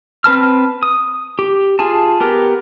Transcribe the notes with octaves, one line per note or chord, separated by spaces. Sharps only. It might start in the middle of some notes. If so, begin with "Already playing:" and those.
C4 B4 A5 F6
D#6
G4
F4 G#4 G#5 A5
B3 G4 A#4